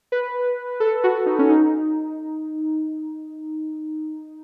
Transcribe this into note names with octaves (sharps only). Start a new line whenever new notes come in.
B4
A4
F#4
D#4
C#4
D#4